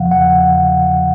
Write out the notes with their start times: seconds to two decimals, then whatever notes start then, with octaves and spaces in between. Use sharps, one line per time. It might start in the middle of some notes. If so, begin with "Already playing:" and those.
Already playing: E2 C#3 F3 F5 F#5
0.11 F#5